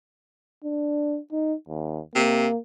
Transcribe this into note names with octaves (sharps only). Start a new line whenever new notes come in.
D4
D#4
D#2
C3 A#3